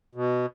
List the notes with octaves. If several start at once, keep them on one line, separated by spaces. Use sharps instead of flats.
B2